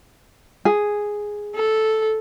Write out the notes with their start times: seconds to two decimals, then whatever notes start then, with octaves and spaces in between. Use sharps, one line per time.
0.65 G#4
1.55 A4